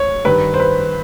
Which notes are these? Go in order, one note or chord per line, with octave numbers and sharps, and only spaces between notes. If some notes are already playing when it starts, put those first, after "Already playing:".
Already playing: C#5
G2 D#3 B4
C5
B4